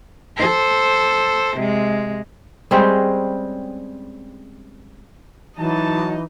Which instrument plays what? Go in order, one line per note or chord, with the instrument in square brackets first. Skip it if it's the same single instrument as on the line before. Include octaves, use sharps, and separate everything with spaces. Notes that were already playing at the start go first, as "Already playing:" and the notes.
[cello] A4 C5
C3 G#3
[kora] G3 G#3 C4 C#4
[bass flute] E3 [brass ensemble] F#3 A5 [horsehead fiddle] D#4 D#5